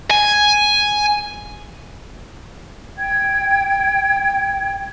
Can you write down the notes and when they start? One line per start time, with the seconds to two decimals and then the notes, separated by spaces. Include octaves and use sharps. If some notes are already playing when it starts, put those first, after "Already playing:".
0.11 G#5
2.97 G5 G#6